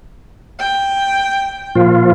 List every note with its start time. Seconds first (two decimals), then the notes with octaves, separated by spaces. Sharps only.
0.59 G5
1.75 A#2 F3 F4